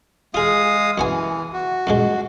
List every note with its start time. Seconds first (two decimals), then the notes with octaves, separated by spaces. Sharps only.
0.34 G#3 F4 G#4 F5 D#6
0.98 F#2 E3 B3 G#5
1.53 F#4
1.87 F#2 A#2 G#3